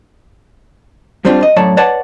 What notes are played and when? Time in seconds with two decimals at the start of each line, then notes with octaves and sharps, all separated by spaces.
1.25 G2 G3 C4 D4 F4
1.43 D#5
1.56 F#2 A2 F#3 C#5 D5 A5
1.77 B4 C#5 D5 F#5 A5